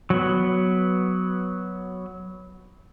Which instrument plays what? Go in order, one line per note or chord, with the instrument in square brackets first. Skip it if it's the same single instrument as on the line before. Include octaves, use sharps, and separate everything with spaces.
[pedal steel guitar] F#3 B3